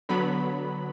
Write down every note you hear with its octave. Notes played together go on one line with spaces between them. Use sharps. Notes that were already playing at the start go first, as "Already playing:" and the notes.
D3 F#3 B3 B5